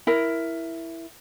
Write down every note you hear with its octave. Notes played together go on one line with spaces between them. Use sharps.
E4 A#4